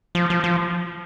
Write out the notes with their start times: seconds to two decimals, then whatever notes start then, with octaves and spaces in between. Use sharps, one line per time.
0.15 F3
0.30 F3
0.44 F3